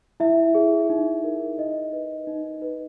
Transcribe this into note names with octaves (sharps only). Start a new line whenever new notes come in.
E4 E5
G#4
D#4
A#4
D#4 D#5
B4
D#4
B4